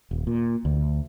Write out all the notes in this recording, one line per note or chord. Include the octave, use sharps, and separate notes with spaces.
D#1
A#2
D2